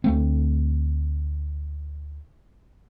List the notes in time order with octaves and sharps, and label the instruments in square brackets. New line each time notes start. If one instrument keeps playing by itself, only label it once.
[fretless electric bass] D2 A3 C4